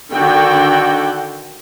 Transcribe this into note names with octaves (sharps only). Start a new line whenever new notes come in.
D3 D#3 F#4 A4 G5